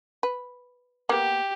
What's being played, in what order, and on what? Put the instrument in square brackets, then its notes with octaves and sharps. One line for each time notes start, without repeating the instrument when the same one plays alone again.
[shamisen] B4
[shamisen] A#3 B3 [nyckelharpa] G4